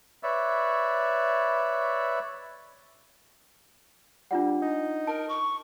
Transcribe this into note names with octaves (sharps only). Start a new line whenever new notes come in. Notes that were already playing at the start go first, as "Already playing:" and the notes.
B4 C#5 D5 E5
G3 D4 F4 F#5
D#4
A#4 A5
C#6